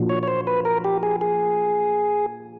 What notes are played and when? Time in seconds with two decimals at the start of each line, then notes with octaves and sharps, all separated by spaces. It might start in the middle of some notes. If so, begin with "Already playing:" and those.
Already playing: A#2 F3 A#3 D4 F#4
0.09 C#5
0.23 C#5
0.28 C5
0.47 B4
0.65 A#4
0.84 G4
1.03 G#4
1.21 G#4